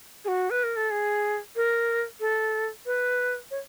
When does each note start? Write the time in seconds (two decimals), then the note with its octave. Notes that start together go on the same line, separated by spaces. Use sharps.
0.25 G#4
0.28 F#4
0.50 B4
0.64 A#4
0.76 A4
0.91 G#4
1.56 A#4
2.20 A4
2.86 B4
3.51 C#5